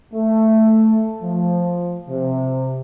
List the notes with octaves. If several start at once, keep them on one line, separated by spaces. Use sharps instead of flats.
A3
F3
C3